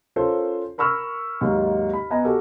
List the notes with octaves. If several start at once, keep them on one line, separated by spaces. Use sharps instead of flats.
C#4 F4 A4 A#4 C5
A#4 B5 C#6 E6 F6
D#2 G#2 F#3
B5
B3 D#5 G#5 A#5
F#4 G4 A4 A#4